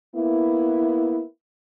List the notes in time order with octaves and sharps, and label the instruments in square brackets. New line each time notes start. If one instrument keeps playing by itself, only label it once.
[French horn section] A#3 B3 E4